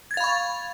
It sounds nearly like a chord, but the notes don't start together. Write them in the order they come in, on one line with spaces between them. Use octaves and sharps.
G#6 A6 F5 B5 C#6